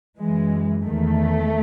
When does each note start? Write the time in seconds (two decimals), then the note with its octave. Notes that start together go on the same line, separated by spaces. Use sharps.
0.19 F#2 E3 G#3
0.86 E2 D#3 A3